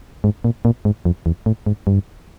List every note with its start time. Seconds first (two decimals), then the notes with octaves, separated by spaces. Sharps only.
0.24 G#2
0.44 A#2
0.65 A#2
0.85 G#2
1.05 F2
1.26 E2
1.46 A2
1.66 G#2
1.87 G2